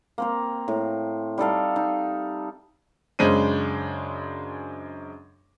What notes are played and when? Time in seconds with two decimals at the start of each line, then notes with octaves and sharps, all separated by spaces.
0.18 A#3 C4 A#4
0.68 A2
1.38 G3 D#4 A4 F5
1.76 D#4
3.19 F#2 C#3 G#3 D4 C5 D#7